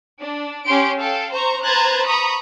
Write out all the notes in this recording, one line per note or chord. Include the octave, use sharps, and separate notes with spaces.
D4
C#4 G4 C6 D7
A4 F5 G5
C5 A#5 C#6
B4 C5 A#5 F#6 G#6 A6
A#5 B5 C#6 D#6